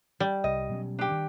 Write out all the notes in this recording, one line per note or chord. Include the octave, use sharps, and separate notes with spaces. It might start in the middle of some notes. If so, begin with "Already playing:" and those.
G3
C2 D#5
B2 F#3 C#4
D4 G4
D#3